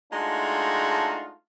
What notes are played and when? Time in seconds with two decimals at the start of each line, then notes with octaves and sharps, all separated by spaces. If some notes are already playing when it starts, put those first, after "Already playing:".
0.12 G#3 A3 D4 D#4 F4 F#4